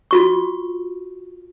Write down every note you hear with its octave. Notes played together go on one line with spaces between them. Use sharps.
F4 F#4 C#6